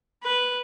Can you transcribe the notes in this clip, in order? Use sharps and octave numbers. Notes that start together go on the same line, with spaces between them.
B4